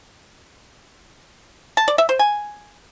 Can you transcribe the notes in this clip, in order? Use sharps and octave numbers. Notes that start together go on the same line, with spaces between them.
A5
D5
E5
C5
G#5